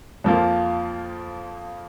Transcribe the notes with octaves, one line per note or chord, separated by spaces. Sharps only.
F2 F3 A#3 F4